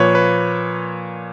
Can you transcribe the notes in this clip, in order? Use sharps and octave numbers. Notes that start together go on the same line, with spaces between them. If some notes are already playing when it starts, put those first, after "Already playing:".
Already playing: A#2 F3 A#3 B4 C#5
B4